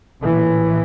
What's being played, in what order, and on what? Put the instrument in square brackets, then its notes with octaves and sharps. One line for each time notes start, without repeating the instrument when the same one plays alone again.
[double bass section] A#1 A2 E3